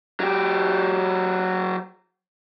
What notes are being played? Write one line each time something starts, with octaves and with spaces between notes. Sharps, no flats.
F#3 G4